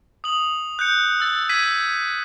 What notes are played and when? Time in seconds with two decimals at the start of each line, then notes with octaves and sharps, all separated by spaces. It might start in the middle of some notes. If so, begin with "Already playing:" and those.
0.24 D#6 F#7
0.79 F#6 G6 C#7
1.20 E6 A6
1.49 E6 G#6 B6 D#7